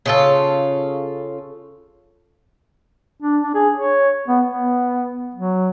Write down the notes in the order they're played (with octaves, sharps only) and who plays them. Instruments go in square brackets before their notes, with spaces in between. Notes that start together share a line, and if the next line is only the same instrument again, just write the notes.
[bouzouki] C#3 F4 A4
[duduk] D4
D4
G#4
C#5
B3
B3
F#3